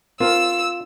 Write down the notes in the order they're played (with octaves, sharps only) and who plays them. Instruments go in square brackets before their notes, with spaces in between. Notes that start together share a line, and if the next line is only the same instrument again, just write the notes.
[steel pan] C4 A#4 [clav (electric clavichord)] F4 [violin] E6